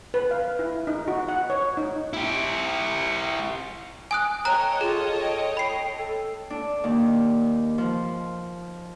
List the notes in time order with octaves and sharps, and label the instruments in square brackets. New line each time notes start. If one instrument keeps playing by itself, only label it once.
[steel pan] B4
F5
E4
D#4
F#4
F#5
C#5
D#4
[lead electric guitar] E4 G4
[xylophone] G#5 D#6 F#6
[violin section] A4 C#5 D#5 [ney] G5 [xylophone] A#5 F#6
[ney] F4 [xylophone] G#4
[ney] G5
[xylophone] B5 C7
[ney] A4
[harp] D4
D#2
F3